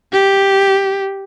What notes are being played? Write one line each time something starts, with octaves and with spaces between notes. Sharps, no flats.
G4